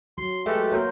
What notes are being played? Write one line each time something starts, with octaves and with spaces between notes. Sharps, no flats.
F#3 C6
G#3 A3 G4 A4 B4 E5
A#3 F#4 A#4 C#5 C6 G6